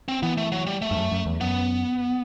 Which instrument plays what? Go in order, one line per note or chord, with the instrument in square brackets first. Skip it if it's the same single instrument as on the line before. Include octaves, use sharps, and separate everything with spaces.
[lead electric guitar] C4
[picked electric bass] E3 [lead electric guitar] B3
[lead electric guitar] A3
F#3
G3
A3
[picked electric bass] G2
F#2
F#2
E2
[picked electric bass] F#2 [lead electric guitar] B3